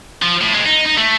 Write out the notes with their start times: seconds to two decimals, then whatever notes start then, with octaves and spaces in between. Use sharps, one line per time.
0.22 F3
0.41 A2
0.54 A#2 G#3
0.66 D#4
0.86 D#4
0.97 A3